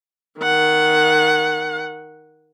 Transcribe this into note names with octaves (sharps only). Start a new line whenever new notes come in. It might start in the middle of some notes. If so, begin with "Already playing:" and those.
D#3 F#5